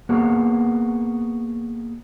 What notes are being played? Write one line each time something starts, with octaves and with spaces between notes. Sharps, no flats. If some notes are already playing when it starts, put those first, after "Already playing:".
A#3 B3 F#4 G#4